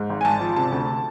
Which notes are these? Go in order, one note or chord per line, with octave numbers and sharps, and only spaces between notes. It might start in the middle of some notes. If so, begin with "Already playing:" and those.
Already playing: G#2
G#1
G#5
G#1 A5
F3
C3 A5
D2